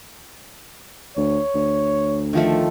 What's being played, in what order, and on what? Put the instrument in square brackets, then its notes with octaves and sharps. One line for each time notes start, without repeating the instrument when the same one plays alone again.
[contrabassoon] D2 [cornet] C#5
[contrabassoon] D2
[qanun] D#3 F3 A3